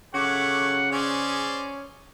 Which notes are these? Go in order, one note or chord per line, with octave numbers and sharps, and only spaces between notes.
C#3 F#3 A3 C#5 F#5 D6
C#4 G#4 C5 D5